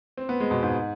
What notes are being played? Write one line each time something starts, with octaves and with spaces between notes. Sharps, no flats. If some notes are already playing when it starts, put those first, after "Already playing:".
C4
B3
G#3
B2
G#2